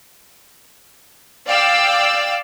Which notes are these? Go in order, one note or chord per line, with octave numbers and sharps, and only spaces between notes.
D5 F5 G5 D6 E6